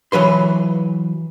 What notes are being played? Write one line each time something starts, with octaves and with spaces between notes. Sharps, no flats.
E3 F#3 B4 C6